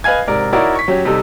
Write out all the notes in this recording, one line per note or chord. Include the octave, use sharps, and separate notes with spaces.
B4 D#5 F5 G#5 G#6
G#2 C3 A#4 D5
D#4 E4 F#4 A#4 C#5 D5
C#6 B6
F#3 C#4 G4
C3 G3 D#4 A4 C5